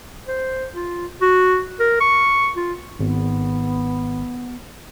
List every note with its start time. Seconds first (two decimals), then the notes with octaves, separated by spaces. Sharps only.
0.28 C5
0.73 F4
1.21 F#4
1.80 A#4
2.00 C#6
2.57 F4
2.99 G#1 B3